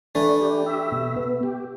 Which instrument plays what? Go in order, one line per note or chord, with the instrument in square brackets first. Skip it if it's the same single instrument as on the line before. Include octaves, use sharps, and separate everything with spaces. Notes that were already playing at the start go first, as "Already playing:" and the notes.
[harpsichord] E3 A3 [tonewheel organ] D4
[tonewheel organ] G4
E5
B2
B3
G4